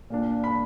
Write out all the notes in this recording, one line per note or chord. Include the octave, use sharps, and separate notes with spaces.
A#2 A#3 D4
B5